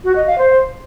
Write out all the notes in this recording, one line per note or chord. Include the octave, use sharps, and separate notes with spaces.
F#4
D#5
F5
C5